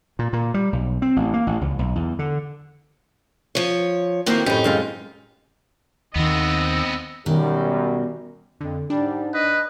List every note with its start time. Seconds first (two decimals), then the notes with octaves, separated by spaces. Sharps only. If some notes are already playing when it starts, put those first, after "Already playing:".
0.19 A#2
0.33 A#2
0.54 G3
0.73 B1
1.02 C4
1.16 A1
1.34 A#3
1.47 A1
1.61 C#2
1.79 B1
1.95 E2
2.19 D3
3.55 F3 C#5
4.26 A2 D#3 A#3 C4 F#4 C5
4.46 F#2 A2 D#4 G4
4.64 F#2 G#3 F4
6.16 D#2 D#3 B3 C4 D#5 E6
7.26 F#2 B2 D#3 G3
8.61 F2 D3
8.90 G#2 G3 D4
9.34 B4 D#5